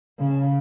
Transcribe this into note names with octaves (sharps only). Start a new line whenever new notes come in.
C#3